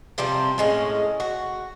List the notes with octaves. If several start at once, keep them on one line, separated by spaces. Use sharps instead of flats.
C3 F3 G3 C4
A2 G#3 C#4
F#4